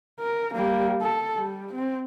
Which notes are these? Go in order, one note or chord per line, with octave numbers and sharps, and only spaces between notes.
A#4
G3 A#3
A4
G3
C4